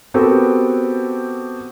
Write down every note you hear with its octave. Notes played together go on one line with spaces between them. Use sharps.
B3 C4 F#4 G4 A4 A#4